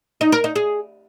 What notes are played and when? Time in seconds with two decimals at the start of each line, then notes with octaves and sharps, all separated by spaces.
0.21 D#4
0.32 A#4
0.44 D#4
0.56 G#4